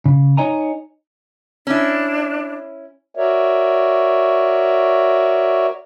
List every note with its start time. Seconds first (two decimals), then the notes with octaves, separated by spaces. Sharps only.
0.06 C#3
0.37 D#4 C#5 D#5 G#5 A#5
1.67 C#4 D4 E4
3.15 F#4 A#4 C#5 D5 E5